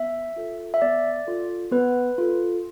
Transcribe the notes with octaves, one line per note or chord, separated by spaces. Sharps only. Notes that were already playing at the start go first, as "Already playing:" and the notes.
Already playing: B3 E5
F4 A4
E5
B3 D5
F4 A4
B3 B4
F4 A4